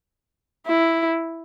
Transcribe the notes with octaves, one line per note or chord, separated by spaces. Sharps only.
E4